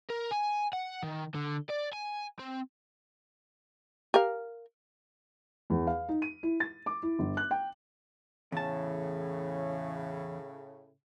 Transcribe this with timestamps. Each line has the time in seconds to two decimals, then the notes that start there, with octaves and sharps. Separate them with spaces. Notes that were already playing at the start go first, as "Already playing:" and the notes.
0.10 A#4
0.32 G#5
0.73 F#5
1.03 D#3
1.35 D3
1.70 D5
1.93 G#5
2.39 C4
4.14 G4 A#4 F5
5.70 E2
5.87 F5
6.09 D#4
6.22 D#7
6.43 E4
6.60 A6
6.86 D6
7.03 E4
7.19 G1
7.37 F#6
7.51 G5
8.52 E2 A2 C#3 A5